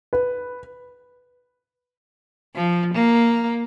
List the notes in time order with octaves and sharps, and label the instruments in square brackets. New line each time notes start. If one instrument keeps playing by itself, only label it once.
[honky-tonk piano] B4
[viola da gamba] F3
A#3